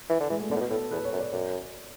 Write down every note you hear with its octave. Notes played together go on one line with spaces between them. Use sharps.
E3
D3
E3 G#3
A3
D3 B3
A2
B2
A2 A4
E2 B4
C#5
F#2
D5
F#2 D5